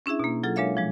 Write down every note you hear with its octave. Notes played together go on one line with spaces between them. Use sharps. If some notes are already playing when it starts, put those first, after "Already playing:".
C#4 D4 E4 G#4 E5
B2 A#3
F#3 F4 G#4 A4
G#3 D4 A#4 C#5 E5 F5
A#2 F3 G#3